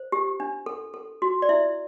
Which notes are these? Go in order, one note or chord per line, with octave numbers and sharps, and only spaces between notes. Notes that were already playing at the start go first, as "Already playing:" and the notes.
Already playing: C5
G4
D4
A4
A4
F#4
D5
E4 E5